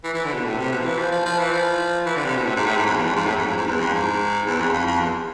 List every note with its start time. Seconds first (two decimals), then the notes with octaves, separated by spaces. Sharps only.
0.04 E3
0.14 E3
0.25 D3
0.34 B2
0.45 A2
0.58 C3
0.72 B2
0.80 F3
0.85 E3
0.98 F3
1.12 F3
1.25 F3
1.39 E3
1.52 F3
2.06 E3
2.16 D3
2.25 C3
2.36 B2
2.46 A2
2.56 G#2
2.66 A2
2.76 G#2
2.86 F2
2.96 E2
3.05 F2
3.16 G#2
3.26 A2
3.36 F2
3.47 G#2
3.57 G#2
3.67 E2
3.80 F2
3.93 G#2
4.47 E2
4.61 F2
4.73 F2
4.87 F2
5.00 E2